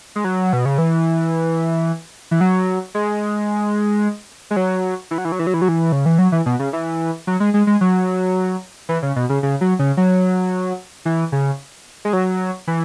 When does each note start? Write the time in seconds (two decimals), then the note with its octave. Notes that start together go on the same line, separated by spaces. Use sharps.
0.16 G#3
0.24 F#3
0.53 B2
0.65 C#3
0.78 E3
2.31 E3
2.41 F#3
2.95 G#3
4.51 G#3
4.56 F#3
5.11 E3
5.18 F#3
5.25 E3
5.32 F#3
5.39 E3
5.47 F#3
5.54 E3
5.62 F#3
5.69 E3
5.92 C#3
6.06 E3
6.18 F#3
6.32 E3
6.46 B2
6.59 C#3
6.73 E3
7.27 F#3
7.40 G#3
7.54 G#3
7.67 G#3
7.81 F#3
8.89 E3
9.03 C#3
9.16 B2
9.29 C#3
9.43 C#3
9.61 F#3
9.79 C#3
9.97 F#3
11.05 E3
11.32 C#3
12.05 G#3
12.13 F#3
12.67 E3